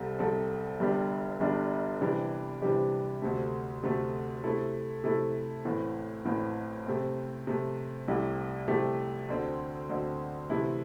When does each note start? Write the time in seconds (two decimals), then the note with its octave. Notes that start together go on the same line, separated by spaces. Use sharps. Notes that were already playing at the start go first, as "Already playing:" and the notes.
Already playing: C2 C3 G3 C4 A4
0.19 C2 C3 G3 C4 A4
0.80 G1 G2 G3 D4 G4
1.40 G1 G2 G3 D4 G4
2.01 C3 E3 G3 D4 G4
2.62 C3 E3 G3 D4 G4
3.22 D2 C3 A3
3.83 D2 C3 A3
4.44 C3 A3 E4 A4
5.04 C3 A3 E4 A4
5.65 A1 A2 E3 C4
6.25 A1 A2 E3 C4
6.86 C3 A3 C4
7.47 C3 A3 C4
8.08 C2 C3 A3 E4 G4
8.68 C2 C3 A3 E4 G4
9.29 D2 D3 C4
9.89 D2 D3 C4
10.50 C3 E3 A3 E4